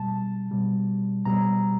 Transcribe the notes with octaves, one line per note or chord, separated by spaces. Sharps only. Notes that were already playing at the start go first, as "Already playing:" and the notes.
Already playing: B2 G3 A5
B2 G3
B2 G3 A#5